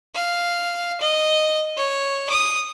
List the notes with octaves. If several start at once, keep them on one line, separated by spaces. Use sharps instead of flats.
F5
D#5
C#5
D#6